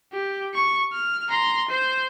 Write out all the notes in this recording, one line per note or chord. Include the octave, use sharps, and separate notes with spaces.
G4
C#6
F6
A#5 C6
C5